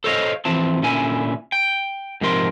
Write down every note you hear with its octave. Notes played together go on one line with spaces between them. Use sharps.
A4 C5 C#5 D#5 F5
E3 F3 C4 A5
A#2 D3 C#4 E4 G#5
G5
G#2 C3 F3 A#4 C6